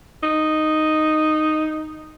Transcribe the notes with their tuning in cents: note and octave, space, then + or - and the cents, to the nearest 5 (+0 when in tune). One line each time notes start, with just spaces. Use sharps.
D#4 -5